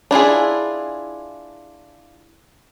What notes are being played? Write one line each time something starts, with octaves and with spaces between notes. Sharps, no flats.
D4 E4 F4 G#4